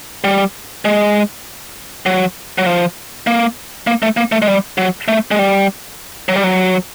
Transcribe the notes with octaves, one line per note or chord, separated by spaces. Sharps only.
G3
G#3
F#3
F#3
F3
A#3
A#3
A3
A#3
A3
G#3
G3
F#3
A3
G#3
G3
F#3
G3
F#3